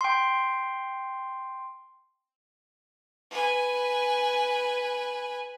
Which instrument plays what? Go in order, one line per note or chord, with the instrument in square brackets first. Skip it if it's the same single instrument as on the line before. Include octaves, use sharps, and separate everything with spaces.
[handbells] G5 C6
[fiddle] B4 G#5